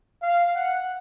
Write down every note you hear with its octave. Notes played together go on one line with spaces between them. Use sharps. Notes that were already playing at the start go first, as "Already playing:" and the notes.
F5
F#5